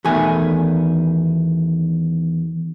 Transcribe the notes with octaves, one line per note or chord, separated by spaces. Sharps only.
E2 B2 D#3 A3 G#5